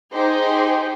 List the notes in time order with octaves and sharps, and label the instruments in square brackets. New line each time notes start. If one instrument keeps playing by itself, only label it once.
[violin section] D#4 G4 G#4 C5